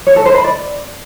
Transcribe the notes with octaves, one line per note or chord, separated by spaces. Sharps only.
C#5
A4
C5
B5
D5